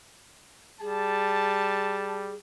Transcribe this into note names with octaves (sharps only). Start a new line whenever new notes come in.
G3 G#4 A5